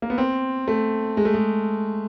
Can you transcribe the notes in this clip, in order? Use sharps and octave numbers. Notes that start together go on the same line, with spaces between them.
A#3
B3
C4
A3
G#3
A3
G#3